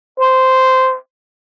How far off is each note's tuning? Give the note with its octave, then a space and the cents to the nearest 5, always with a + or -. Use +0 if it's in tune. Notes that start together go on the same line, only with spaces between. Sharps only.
C5 -10